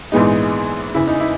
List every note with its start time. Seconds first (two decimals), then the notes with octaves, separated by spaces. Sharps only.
0.12 A#1 G#2 E3 G#3 B3 D#4
0.94 F#1 E2 C#3 E4
1.07 D#4
1.20 E4